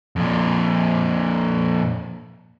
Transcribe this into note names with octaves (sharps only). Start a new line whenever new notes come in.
F2 A#2